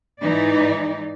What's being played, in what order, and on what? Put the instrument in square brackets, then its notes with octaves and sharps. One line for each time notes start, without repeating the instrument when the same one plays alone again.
[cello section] G#2 E3 D#4 D5